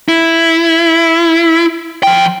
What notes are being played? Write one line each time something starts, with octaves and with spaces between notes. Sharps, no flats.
E4
F3 G5